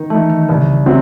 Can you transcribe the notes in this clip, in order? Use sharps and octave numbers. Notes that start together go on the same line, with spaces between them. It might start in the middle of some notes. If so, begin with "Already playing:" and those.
Already playing: D#3 D#4
E3 A3 D#4
D#3
D#3
C2 C#3
C3 F#3 C4